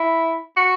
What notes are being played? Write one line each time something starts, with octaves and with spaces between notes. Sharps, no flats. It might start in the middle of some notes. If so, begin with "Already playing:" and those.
Already playing: E4
F#4